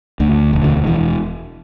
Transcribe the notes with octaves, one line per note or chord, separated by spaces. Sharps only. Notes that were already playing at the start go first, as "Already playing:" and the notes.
D2 D3
E1
D3
E3